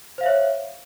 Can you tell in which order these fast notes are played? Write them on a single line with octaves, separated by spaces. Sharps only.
C5 F5 E5 C#5